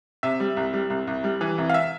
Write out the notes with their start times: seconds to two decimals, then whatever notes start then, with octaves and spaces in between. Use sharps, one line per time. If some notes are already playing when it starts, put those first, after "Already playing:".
0.23 C3 E5
0.40 G3
0.57 C2
0.74 G3
0.90 C2
1.07 C2
1.24 G3
1.41 E3
1.58 C2
1.69 F5
1.74 E5